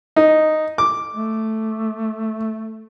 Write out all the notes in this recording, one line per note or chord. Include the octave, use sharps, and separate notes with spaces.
D#4
D6
A3